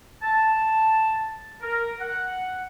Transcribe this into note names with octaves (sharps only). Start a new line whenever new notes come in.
A5
A#4
F#5